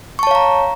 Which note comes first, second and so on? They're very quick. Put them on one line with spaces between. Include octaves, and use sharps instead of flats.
C#6 A5 C#5 F5 A#5